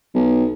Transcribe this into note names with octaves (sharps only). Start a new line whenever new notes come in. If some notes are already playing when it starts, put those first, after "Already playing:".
B1